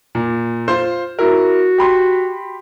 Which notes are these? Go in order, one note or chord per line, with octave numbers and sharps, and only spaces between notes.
A#2
F4 C5 C6
E4 F#4 A#4
G4 B5 C6